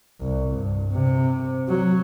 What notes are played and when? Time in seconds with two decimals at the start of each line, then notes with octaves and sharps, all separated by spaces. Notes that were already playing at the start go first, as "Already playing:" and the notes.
0.20 C2
0.54 G2
0.93 C3
1.69 F#3